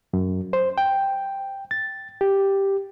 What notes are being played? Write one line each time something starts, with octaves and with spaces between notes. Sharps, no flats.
F#2
C5
G5
A6
G4